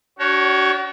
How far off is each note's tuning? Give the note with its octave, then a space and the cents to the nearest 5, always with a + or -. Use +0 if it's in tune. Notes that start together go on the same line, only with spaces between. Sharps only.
D4 -30 F#4 +35 C#5 +0